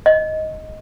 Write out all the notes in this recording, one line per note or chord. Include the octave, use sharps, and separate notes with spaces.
D#5